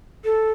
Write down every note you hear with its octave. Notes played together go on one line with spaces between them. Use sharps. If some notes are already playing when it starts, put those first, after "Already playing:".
A4